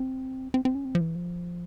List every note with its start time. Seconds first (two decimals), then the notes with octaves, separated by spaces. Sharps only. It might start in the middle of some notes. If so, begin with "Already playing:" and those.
Already playing: C4
0.54 C4
0.65 C4
0.75 C#4
0.85 C4
0.95 F3
1.01 E3
1.16 F3